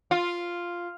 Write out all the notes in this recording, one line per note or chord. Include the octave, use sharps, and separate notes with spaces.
F4